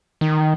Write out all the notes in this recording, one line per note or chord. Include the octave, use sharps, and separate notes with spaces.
D#3